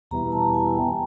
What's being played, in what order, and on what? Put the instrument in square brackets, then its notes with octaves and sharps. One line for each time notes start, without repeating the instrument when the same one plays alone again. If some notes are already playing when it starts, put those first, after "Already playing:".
[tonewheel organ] E2 B2 G3 B3 E4 [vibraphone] A#5
[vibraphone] A5
G#5
G5